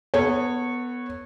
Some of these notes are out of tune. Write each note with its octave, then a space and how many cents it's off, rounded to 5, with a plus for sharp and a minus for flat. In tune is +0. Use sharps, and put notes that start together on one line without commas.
B3 +0 A4 +40 C#5 -15